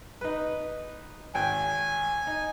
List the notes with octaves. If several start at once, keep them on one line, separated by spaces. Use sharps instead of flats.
D#4 B4
G#1 G5 G#5
D#4